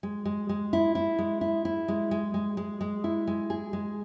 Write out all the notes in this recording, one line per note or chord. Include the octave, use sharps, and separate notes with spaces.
G#3
G#3
G#3
E4
E4
G#3
E4
E4
G#3
G#3
G#3
G#3
G#3
E4
G#3
G#4
G#3